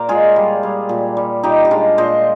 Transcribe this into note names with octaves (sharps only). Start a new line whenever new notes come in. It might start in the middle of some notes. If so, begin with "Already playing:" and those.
Already playing: A#2 A#4 C5 D5
G#3 F4 G#4
G3
G3
A#2
G3
A#2 D#4 G4
G4
G#3 D4 F4
A#2 C5 D#5